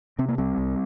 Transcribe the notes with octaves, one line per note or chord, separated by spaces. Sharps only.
C3 C4
A#3
C2 G3 C4
C2